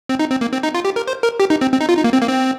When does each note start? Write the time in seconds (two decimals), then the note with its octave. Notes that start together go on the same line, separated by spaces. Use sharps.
0.09 C4
0.19 D#4
0.31 C4
0.41 A#3
0.53 C4
0.63 D#4
0.74 F4
0.85 G4
0.96 A#4
1.07 C5
1.23 A#4
1.40 G4
1.50 D#4
1.61 C4
1.72 C4
1.80 D#4
1.89 F4
1.97 D#4
2.04 A#3
2.13 C4
2.21 A#3
2.29 C4